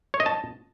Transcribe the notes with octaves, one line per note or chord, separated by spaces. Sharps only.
C#5
D#5
A5